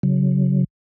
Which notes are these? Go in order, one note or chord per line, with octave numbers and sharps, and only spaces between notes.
C#3 F#3